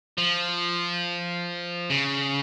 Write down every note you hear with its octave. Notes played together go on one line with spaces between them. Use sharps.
F3
C#3